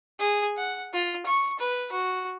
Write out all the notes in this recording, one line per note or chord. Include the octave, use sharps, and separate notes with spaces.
G#4
F#5
F4
C#6
B4
F#4